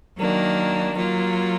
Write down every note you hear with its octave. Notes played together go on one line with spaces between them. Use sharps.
D#3 F#3 A#3 D4
F#3 A#3 F4